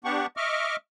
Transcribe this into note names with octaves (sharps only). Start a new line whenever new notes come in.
B3 D4 G4 F#5 C#6
D#5 E5 C#6 D6 F6